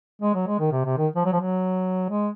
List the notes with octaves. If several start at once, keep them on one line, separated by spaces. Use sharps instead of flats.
G#3
F#3
G#3
D#3
C3
C3
D#3
F3
F#3
F3
F#3
G#3